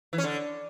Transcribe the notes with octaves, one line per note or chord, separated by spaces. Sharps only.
E3
C#4
D3